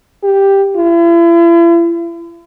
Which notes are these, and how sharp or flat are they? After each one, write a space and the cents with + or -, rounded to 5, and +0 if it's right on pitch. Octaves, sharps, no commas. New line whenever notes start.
G4 +5
E4 +40